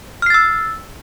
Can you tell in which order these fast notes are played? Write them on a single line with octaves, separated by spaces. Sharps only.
F6 C7 A6 E6